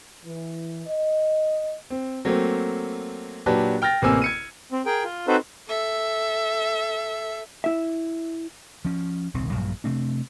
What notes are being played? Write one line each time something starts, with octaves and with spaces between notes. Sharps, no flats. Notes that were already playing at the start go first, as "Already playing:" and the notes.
E3
D#5
C4
F#3 A3 A#3 C4
A#2 F#3 D4 G4 B4 A5
G5 F6 A6 A#6
A1 C3 A#3 G#5 E6
G#6 C#7 D#7
C4
G#4 A#4 G5
F4
C4 D#4 F#4 A4 B4 C5
A4 E5
E4 E5
F3 C#4
D#1 C2 D#3 C4
A#1 G2 A#2 F#3
C3 A3 C4 D4